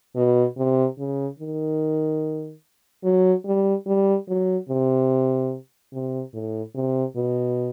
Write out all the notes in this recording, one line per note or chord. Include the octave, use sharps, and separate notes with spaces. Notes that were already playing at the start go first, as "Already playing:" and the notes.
B2
C3
C#3
D#3
F#3
G3
G3
F#3
C3
C3
A2
C3
B2